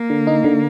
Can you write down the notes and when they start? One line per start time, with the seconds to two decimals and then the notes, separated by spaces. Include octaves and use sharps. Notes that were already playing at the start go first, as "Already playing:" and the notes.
Already playing: A#3
0.10 D3
0.27 D#4
0.44 D3